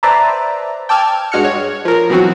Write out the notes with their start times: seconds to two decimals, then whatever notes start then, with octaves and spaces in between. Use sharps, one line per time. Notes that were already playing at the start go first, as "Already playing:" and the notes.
0.03 B4 C5 D5 E5 A5 A#5
0.89 G5 A5 D6 E6 F6 G#6
1.32 G2 G#3 F#4 F6 F#6 C#7
1.45 C#5
1.85 F3 A#4
2.10 B2 E3 F#3 C4 F#4